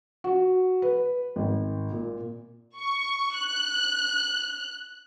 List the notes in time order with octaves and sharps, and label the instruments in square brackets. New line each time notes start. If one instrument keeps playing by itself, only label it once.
[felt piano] F#4
B4
G#1
A#2
[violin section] C#6
F#6